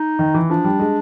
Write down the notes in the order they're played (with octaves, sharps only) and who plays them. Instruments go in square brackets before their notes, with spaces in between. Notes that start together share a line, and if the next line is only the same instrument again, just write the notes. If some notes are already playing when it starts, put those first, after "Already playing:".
Already playing: [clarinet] D#4
[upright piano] D#3
E3
[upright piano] F3 [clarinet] D4
[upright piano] G3
G#3